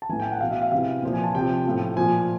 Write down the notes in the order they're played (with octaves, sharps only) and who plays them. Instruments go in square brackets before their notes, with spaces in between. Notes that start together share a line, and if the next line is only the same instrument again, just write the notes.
[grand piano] A5
A2 E3 G#5
G5
F#5
B2 F5
E5
F5
C3 E3 F5
A#2 F3
G#5
A5
C3 F3 G5
A2 F3
A#2 F3 G#5